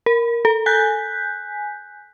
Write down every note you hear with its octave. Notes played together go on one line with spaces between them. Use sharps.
A#4
A4
G#5 F#6 G6 B6